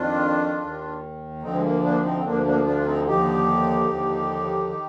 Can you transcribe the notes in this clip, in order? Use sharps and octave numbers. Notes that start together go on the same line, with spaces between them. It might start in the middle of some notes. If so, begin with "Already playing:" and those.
Already playing: F2 D#3 D4 F4
D#2 D#3
D2 D3 F3 C4 D#4
G#3
A#3
A#3 D4
C4 D#4
C4
D2 D3 F3 A#3 D4
A#3 D4
D4 F4
F4
C4 D#4
D#2 D3 F3 D#4 G4
D#2 D3 F3
D#3